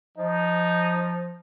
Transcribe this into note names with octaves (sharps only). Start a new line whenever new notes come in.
F3 D#4